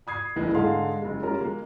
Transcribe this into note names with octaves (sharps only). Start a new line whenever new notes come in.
B5 D#6 G#6 C7
F#1 C2 A2 E3 A#3 D#5
G#2 D3 G#4 D#5 F5 C6
F#1 G#3
G3 C#4 F4 A#4
G#3 A#3